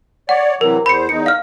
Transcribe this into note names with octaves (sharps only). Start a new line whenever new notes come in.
C#5 D5 F#5
C3 E3 F#3 A#4
E2 C5 B5 C#7
E2 D#4 C#7
F5 F6